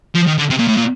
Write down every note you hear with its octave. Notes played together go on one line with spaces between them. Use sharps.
F3
D#3
D3
C3
A#2
A2
A#2